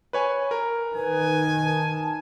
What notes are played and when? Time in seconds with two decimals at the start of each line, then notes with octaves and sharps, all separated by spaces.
0.13 B4 C#5 G#5
0.51 A#4
0.94 D#3 B4 G#5
1.61 A5